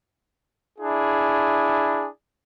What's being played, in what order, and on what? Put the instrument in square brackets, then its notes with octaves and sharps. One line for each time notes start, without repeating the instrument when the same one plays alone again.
[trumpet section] D4 E4 G#4